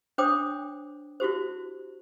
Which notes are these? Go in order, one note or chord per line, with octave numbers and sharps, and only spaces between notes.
D4 C5 C#5 G5 D6 D#6
E4 F#4 G4 C5